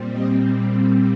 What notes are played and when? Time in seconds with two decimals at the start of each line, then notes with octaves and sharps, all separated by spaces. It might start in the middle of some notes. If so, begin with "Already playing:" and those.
Already playing: A#2 G3 C4
0.10 D#5